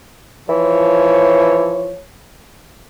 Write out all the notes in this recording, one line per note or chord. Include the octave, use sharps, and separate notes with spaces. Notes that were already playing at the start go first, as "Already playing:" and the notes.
E3 F3 C#5